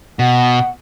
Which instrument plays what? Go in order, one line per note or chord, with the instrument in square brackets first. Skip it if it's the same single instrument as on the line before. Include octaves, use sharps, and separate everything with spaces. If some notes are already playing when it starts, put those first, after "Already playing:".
[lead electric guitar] B2 [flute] F#5